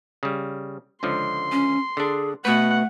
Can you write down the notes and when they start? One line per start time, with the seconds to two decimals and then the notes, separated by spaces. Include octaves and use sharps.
0.23 C#3 G3
1.03 C#2 D3 F3 C6
1.52 C#4
1.97 D3 D4 G#4
2.45 B2 A3 B4 F#5